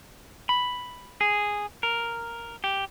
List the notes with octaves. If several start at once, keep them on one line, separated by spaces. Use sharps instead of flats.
B5
G#4
A#4
G4